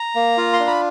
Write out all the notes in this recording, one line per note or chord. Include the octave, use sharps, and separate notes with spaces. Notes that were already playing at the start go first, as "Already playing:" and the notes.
Already playing: A#5
A#3
F4
C6
D4
B5